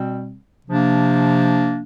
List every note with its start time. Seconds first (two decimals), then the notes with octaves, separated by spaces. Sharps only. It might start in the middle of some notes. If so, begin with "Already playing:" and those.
Already playing: B2 G3 C4
0.66 C3 F3 A#3 D4